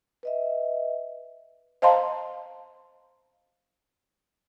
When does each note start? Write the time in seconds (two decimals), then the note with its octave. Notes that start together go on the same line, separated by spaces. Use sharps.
0.23 B4 D#5 E5
1.82 C5 D#5 F5 A5 A#5 C6